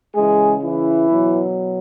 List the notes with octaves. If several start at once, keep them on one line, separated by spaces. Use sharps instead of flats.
C#3 E3 G#3 G#4
E3 E4
B2 F#3